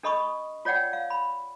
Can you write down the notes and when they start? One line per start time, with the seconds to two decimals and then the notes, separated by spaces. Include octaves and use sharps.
0.03 D4 A4 D#5 B5 C#6 D#6
0.65 F4 C#5 D5 F#5 G5
0.93 F5
1.10 B5